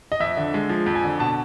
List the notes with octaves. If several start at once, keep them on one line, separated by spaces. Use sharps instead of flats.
D#5
F2 E5
D3
G#3
F3
F2
G#5
D3
B2 A5